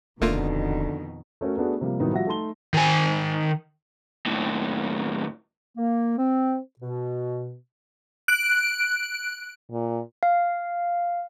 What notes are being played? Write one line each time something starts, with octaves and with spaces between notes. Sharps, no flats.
D#1 F2 B2 D3 D#3 A3 A#3 F4
A3 C#4 F#4 A#4
A3 B3 D4 F#4 G#4
C3 F3 G3 A#3
A2 D#3 F#3 G3 B3 D#4
F3 G3 F#4 E5 F#5 A#6
A3 D#4 A5 C6 G7
D#3 G#5
D#2 A2
A#3
C4
B2
F#6 D7
A#2
F5